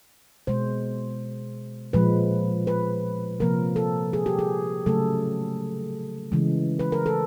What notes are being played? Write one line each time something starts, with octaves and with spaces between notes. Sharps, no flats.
B2 G#3 C5
A#2 F3 G#3 B4
B4
C3 F3 A#3 A#4
A4
G#4
G4
G#4
C#3 F#3 A3 A4
C#3 E3 G#3
B4
A#4
A4